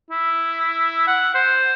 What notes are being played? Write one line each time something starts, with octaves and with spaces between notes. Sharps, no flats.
E4
F#5
C5